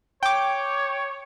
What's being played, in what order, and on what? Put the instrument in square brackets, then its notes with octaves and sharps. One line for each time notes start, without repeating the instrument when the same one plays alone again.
[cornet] C#5 [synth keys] G5 D6